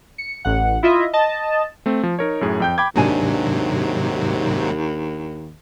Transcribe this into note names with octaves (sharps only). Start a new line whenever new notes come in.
C#7
A1 F#5
E4 F4 D#5 E5
D#5 A5
A3 C4
F3
D#4 A#4 C#5
F#2 A2 G#4
F2 G5 G6
G5 B5 D6 G#6
D#2 G#2 C3 F#3 D4 G#5